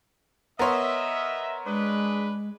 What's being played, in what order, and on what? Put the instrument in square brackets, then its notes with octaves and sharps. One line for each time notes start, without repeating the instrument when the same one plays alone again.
[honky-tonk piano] B3 C6 [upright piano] A#4 C#5 [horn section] D#5 E5
[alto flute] G#3 [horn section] D4 G#4 B4